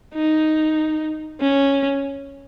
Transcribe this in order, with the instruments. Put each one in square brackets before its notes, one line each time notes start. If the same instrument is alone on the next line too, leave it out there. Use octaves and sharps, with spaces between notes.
[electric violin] D#4
C#4